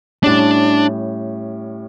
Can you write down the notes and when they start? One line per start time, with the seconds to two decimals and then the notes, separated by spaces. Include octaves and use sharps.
0.23 A2 G3 C#4 D4